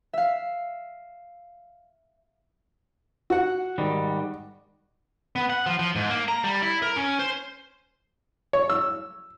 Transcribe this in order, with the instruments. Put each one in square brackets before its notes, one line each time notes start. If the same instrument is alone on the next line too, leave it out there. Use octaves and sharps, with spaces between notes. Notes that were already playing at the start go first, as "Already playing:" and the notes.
[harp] E5 F5
[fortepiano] F#4 F#5
[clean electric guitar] G#2 D#3 G3
[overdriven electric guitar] B3
F#5
F3
F3
G#2
A#3
A#5
G3
E4
A#4
C#4
C5
[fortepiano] C#5
E6